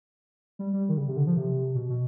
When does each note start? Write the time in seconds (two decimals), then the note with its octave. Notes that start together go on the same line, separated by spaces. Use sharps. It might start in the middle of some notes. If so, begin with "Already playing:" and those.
0.59 G3
0.73 G3
0.89 D#3
0.97 C#3
1.08 C3
1.17 D3
1.27 F3
1.37 C3
1.75 B2
1.89 B2